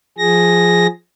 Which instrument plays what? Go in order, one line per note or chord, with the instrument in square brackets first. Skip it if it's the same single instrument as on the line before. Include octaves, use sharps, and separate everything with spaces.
[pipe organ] F3 G#4 A#6